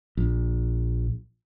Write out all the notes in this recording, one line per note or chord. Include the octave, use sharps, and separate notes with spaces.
A#1